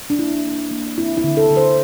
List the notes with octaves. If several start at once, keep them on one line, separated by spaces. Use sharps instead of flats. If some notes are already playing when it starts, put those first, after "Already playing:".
D4
A#3 E4
A#3
A#3
C4 E4
E4
D3
A4
D3
C5